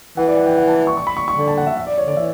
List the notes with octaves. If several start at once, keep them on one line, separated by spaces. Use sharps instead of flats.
E3 F#5
D5
F#5
G5
F#5
A5
C#6
C#6
B5
C#6
C#6
D3
A5
F#5
E5
E5
D5
C#5
D3 D5
E3 E5